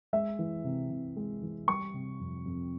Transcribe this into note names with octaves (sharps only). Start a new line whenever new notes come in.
G#3 E5
E3
C3
C3
G#3
E3
G3 C#6
C3
F2
F2